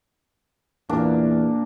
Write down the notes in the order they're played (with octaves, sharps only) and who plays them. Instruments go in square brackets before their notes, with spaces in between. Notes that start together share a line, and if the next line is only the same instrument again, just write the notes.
[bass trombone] E2 [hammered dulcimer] A#2 D4